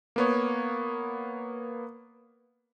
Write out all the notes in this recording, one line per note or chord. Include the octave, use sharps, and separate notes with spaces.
A#3 B3 C#5